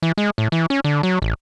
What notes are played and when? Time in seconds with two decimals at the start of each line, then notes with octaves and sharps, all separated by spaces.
0.02 E3
0.18 G#3
0.38 A2
0.52 E3
0.70 C#4
0.84 D3
1.03 F#3
1.22 A1